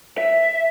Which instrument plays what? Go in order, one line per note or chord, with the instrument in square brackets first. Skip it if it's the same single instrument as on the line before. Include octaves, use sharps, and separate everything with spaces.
[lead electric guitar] E5